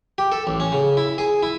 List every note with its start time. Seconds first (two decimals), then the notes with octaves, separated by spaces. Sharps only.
0.18 G4
0.32 A4
0.47 A1
0.60 C#4
0.72 C#3
0.97 E4
1.18 G#4
1.43 E4